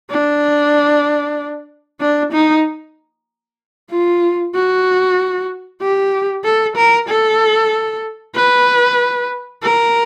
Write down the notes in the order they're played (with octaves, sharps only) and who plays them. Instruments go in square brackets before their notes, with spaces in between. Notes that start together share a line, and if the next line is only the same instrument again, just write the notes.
[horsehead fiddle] D4
D4
D#4
F4
F#4
G4
A4
A#4
A4
B4
A#4